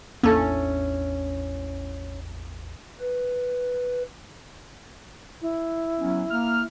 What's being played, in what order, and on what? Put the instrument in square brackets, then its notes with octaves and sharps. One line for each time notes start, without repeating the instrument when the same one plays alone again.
[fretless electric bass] A1 E2 D4 [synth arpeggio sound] A#3 [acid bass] C#4 [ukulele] E4 A4
[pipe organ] B4
[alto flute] E4
[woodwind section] F#3 B3 C#4
A#3 F6